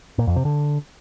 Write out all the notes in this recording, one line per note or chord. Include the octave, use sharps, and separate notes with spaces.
A#2
F2
C3
D3